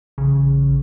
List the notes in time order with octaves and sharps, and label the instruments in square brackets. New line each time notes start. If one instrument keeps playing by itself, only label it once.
[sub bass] A1 [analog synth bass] C#3